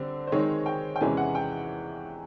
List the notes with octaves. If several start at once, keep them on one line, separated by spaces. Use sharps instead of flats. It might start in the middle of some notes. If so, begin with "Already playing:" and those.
Already playing: D3 G3 C4
C5
D#3 G#3 C4 D#4 C#5
G5
G5
E2 C3 E3 G#3 C#4 G#5
F#5
G5